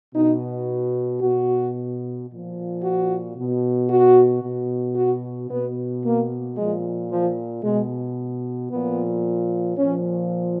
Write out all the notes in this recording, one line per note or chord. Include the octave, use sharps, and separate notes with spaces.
B2 D#4
B2 F#4
A#2 F3
F#4
B2
F#4
B2
F#4
B2 B3
A#3
A#2 F3 G#3
F3
B2 G#3
A#2 F3 B3
A#2 F3 C#4